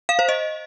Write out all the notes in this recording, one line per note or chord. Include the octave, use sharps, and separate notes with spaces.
F5
C5
D#5